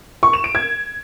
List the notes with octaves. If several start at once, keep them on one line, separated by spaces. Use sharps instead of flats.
C#6
E7
D7
G#6